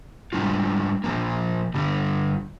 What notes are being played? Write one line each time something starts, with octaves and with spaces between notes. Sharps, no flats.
G#2 G3 D4 F4
A#2 F3 A#3
G2 D3 G3